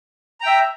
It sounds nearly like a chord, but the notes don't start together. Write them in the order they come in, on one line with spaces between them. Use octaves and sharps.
A#5 G5 E5